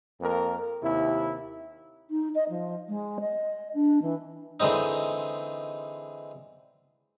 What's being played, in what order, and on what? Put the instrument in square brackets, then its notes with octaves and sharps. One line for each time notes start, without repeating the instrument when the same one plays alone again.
[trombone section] F2 A#3 A#4
D#2 C3 E4
[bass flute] D#4
D#5
F3
G#3
D#5
D4
E3
[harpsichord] D3 E3 G#3 C4 D#4